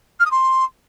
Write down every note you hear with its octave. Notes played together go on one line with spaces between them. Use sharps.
F6
D#6
C6